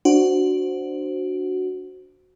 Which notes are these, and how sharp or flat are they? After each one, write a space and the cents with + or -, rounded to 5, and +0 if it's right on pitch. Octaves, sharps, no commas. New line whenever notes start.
D4 +0 F#4 +0 C5 +0